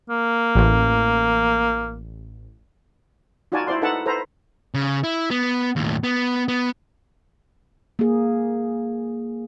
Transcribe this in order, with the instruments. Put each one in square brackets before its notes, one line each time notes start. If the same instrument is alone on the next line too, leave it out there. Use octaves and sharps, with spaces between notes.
[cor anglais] A#3
[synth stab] A1
[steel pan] D#4 F4 F#4 D5 G#5 A5
E4 C5 D5 C6
D#4 A4 B4 E5 F#5 A5
A4 B4 C5 A#5
[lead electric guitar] C#3
E4
B3
D#2 A2
B3
B3
[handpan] A#3 G#4